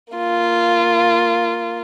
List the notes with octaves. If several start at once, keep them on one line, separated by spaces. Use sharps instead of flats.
A#3 F4